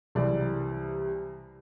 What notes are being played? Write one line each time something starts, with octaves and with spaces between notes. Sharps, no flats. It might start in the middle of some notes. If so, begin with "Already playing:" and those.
C2 C3 E3 G3 D5